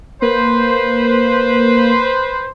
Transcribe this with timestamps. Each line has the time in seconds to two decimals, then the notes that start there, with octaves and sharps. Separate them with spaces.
0.22 A#3 B4 C5